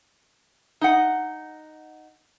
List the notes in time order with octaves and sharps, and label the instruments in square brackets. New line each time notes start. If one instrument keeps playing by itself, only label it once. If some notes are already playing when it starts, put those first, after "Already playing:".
[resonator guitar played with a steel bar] D#4 F#5